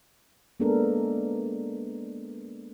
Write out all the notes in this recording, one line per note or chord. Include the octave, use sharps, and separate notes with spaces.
G#3 A#3 B3 D4 A4 A#4